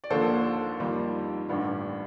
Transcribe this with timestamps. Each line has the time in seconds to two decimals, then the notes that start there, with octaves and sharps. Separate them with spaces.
0.04 D5
0.10 D#2 D3 F3 A#3 A4 C5
0.79 F2 D#3 G3 A#3
1.49 A1 G2 D3 G3